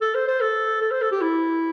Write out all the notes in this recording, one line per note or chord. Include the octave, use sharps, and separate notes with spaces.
A4
C5
C5
A4
A4
C5
A4
G4
E4